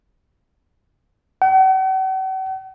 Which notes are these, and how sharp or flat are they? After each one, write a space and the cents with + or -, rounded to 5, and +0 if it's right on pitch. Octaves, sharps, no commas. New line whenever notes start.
F#5 +45